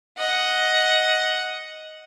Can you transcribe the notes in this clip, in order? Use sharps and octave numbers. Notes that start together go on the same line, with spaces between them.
D#5 F#5